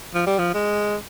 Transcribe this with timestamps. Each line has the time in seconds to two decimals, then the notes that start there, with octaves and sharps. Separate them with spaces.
0.14 F3
0.26 G3
0.39 F3
0.54 G#3